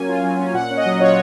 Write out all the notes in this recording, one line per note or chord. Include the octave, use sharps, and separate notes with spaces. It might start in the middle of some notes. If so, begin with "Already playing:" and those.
Already playing: F#3 A#3 C#4 G#5
F4
F#3
C#4
A#2 F#5
C#4
D#5
F#3
F4 C#5